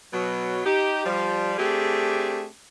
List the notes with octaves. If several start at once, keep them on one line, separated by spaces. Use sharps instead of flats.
B2 F#3
D#4 G4
F3 G3
A3 C4 D4 G4 G#4